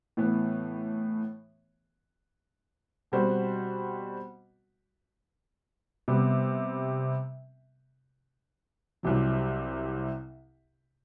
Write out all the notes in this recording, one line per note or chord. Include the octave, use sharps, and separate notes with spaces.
A2 E3 B3
B2 G3 C4 F#4 C5
C3 G3 B3
C2 C3 F#3